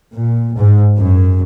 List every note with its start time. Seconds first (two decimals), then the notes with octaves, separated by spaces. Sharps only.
0.13 A#2
0.55 G#2
0.99 F#2